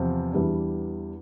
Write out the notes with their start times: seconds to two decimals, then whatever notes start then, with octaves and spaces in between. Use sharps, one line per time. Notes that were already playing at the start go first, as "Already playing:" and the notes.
Already playing: E2 C3 F3 C4
0.33 E2 E3 G3 D4